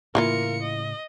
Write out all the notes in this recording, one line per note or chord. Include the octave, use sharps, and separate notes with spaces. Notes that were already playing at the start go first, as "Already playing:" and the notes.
A2 C#3 E3 A#3 F4 A#4 C#7
D#5